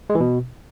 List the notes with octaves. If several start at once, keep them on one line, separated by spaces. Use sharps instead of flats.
G#3
E3
B2